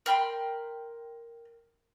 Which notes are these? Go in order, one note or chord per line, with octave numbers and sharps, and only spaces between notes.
A#4 G5 B5 C6